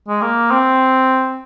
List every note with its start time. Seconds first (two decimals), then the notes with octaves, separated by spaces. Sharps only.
0.08 G#3
0.22 A#3
0.51 C4